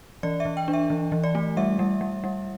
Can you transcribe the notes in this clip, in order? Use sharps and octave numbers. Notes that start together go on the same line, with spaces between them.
E3 D5
E5
E3
G5
D4
E5
E3
E3
D5
A3
G3 E5
G3
G3
G3